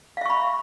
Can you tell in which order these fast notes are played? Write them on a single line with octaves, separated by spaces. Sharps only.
F5 E5 C#6 B5